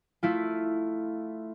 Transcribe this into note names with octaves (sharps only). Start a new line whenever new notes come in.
A3 E4 F4